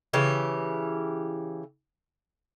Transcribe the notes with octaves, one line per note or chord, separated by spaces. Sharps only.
C#3 E3 G4